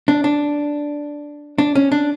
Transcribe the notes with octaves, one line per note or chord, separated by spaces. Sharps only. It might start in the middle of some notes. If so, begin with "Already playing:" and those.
D4
D4
D4
C#4
D4